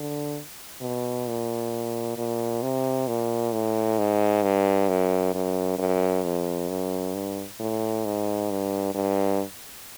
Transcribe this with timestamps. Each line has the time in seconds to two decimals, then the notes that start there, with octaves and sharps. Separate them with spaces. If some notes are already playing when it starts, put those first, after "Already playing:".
Already playing: D3
0.81 B2
1.27 A#2
2.17 A#2
2.63 C3
3.07 A#2
3.53 A2
3.98 G#2
4.43 G2
4.89 F#2
5.34 F#2
5.78 F#2
6.24 F2
6.69 F#2
7.14 G2
7.59 A2
8.04 G#2
8.51 G2
8.95 G2